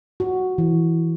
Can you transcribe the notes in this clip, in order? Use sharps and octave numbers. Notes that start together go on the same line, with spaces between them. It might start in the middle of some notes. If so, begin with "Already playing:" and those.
F#4
E3